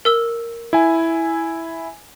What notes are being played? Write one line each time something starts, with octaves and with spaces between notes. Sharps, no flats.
A#4 E6 G7
E4 G#5